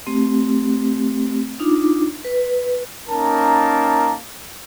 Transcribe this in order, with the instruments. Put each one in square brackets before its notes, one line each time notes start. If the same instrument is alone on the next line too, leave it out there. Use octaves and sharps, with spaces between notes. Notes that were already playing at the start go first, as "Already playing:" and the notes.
[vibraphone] A3 C4 G4
D4 D#4 F4 D6
B4
[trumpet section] A#3 C#4 D#4 A#4 A5